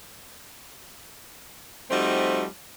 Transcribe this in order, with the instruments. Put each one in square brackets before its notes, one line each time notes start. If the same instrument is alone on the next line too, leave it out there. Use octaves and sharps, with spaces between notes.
[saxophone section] F3 G3 A3 C4 D#4 F#4